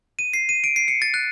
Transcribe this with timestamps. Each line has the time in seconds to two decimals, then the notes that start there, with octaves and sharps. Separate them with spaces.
0.19 D#7
0.33 C7
0.49 D#7
0.64 D7
0.76 C7
0.88 C#7
1.02 A6
1.14 F#6